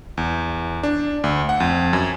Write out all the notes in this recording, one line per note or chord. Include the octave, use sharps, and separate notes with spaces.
E2
D4
D2
F#5
F2
F#2